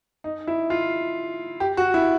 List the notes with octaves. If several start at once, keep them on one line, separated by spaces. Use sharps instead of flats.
D#4
E4
F4
G4
F#4
E4